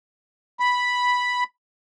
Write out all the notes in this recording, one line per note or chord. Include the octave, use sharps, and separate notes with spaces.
B5